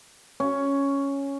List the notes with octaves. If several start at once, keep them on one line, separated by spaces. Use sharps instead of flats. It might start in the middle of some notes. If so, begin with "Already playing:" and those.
C#4